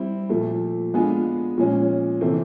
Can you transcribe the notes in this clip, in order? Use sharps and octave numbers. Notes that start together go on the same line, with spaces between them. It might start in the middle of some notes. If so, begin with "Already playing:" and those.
Already playing: G3 C4 E4
A#2 F3 A3
G#3 B3 D4 F4 G#4
A#2 F3 G#3 C#4
C3 E3 A3 C4